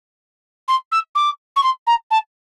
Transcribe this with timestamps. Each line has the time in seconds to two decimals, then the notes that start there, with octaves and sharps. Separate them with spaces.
0.68 C6
0.92 E6
1.15 D6
1.56 C#6
1.63 C6
1.87 A#5
2.11 A5